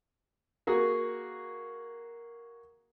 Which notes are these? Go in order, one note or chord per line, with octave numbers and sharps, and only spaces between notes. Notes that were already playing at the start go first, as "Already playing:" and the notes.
A#3 F#4 G#4